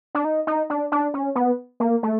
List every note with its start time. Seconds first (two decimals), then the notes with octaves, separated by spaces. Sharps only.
0.15 D4
0.25 D#4
0.47 D#4
0.70 D4
0.92 D4
1.14 C#4
1.35 B3
1.80 A#3
2.03 A3